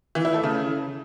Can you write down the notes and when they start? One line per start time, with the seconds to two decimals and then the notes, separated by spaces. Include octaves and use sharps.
0.15 E3
0.25 E4
0.34 A3
0.44 C#3